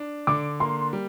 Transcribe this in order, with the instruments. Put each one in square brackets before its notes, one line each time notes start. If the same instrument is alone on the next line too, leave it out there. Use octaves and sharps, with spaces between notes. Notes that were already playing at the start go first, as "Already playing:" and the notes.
Already playing: [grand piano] D4
[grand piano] D3 [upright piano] D6
[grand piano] A#3 [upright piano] C6
[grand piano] G3